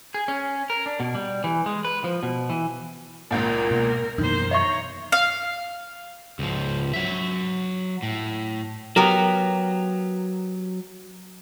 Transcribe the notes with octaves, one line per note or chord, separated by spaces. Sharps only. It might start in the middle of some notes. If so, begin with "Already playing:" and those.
G#4
C#4
A#4
D4
B2
G3
E3
G#3
B4
F3
B2
E3
G#1 C#2 A#2 A#3 A#4
B2
F#2 B2 D#3 E3 A#3 C5
C#5 D#5 E5 A#5 C#6
F5
C#2 F3
F#3 E5
A2
F#3 B3 G4 A#4